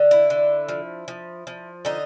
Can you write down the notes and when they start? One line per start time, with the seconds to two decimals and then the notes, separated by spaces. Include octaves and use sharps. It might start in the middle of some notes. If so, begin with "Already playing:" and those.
Already playing: D3
0.11 E4
0.30 D3
0.69 F3
1.08 F3
1.47 F3
1.85 D3 D#4